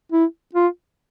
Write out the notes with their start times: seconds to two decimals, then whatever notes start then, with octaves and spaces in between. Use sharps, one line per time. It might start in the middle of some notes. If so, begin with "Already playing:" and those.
0.12 E4
0.54 F4